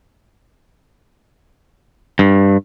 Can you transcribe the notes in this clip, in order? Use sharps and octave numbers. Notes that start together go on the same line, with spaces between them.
G2